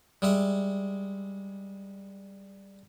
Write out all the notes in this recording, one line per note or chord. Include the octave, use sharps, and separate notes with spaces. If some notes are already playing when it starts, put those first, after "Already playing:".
G3 G#3 E5